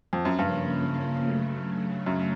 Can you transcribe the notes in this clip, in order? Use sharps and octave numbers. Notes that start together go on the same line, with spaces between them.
F2
F#2
G2 C#3 F3 A#3 C#4
C#3 F#3 A3
F#2